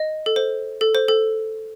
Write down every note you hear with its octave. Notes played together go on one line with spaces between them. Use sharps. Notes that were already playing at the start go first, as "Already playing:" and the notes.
Already playing: D#5
A4
C5
A4
C5
A4